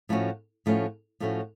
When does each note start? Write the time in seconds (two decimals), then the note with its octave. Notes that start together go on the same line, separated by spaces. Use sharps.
0.09 A2 F3 A3 C#4 F#4
0.66 A2 F3 A3 C#4 F#4
1.20 A2 F3 A3 C#4 F#4